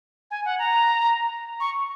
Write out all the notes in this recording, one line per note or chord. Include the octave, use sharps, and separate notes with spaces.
G#5
F#5
A#5
C#6